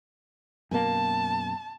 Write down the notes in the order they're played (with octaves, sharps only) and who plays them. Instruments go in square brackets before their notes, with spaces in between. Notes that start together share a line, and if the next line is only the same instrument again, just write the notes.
[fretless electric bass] F#2 B2 A#3 [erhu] A5